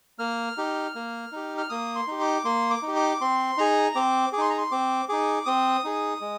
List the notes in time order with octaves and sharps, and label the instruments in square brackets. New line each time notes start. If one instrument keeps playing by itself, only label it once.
[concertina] A#3 F6
D#4 G4
A#3
D#4 G4
F6
A#3 D#6
C6
D#4 G4
D6
A#3 C6
D6
D#4
G4
D6
C4 C6
D#4 G#4 A#5
C4 D6
G#4 D6
D#4 C6
A#5
C6
C4 D6
D#4 G#4 D6
C4 D#6
D#4 G#4
G#3